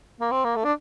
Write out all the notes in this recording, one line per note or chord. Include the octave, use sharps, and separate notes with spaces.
A#3
C4
A#3
A3
D4